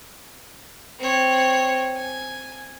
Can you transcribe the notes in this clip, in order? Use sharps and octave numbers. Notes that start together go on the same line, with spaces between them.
C4 C#5
G#5